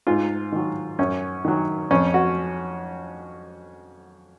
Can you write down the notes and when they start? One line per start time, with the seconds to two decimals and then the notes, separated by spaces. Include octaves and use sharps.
0.07 G#2 F4
0.52 D#3 F#3
0.99 F#2 C#4
1.45 D#3 F#3
1.91 F2 C#4
2.14 F#4